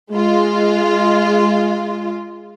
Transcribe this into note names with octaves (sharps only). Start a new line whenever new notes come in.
G#3 F4